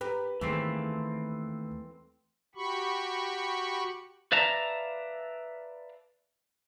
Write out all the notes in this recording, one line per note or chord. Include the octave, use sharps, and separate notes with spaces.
G4 A#4 B4
D#2 E3 A3 A#3 C4 G#4
F#4 G4 B5 C#6
B4 D5 E5 F5 A5 A#5